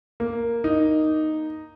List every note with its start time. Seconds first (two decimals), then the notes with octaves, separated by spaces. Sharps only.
0.20 A#3
0.64 D#4